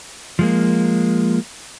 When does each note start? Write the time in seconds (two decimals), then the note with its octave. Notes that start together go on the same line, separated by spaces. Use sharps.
0.39 F3 G#3 A#3